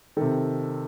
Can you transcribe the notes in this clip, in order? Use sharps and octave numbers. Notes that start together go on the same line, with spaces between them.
C3 D#3 A4